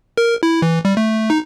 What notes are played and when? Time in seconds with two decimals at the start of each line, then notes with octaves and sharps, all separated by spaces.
0.18 A#4
0.43 E4
0.62 E3
0.85 G3
0.97 A3
1.30 D#4